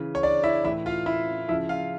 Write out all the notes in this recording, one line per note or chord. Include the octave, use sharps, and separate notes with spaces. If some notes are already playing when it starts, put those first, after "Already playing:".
Already playing: C#3 E3
C#5
D4 D5
E4 E5
A2 E3 E4 E5
F4 F5
E4 E5
C#3 F3 E4 E5
F4 F5